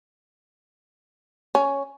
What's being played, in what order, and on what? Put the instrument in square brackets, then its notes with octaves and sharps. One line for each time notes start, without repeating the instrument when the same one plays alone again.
[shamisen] C#4